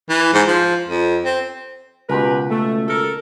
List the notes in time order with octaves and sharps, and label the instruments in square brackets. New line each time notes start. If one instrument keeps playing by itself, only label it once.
[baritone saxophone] E3
G#2
F3
F2
C4
[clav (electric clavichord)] C#2 B2 [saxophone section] G4 A#4 B4
[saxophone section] A3
A4 A#4